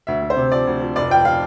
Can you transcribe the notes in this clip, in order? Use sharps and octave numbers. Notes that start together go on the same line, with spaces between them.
D2 E5
D2
C5
C3
F3 D5
D2
F3
F1 D5
F3 G5
F3 F5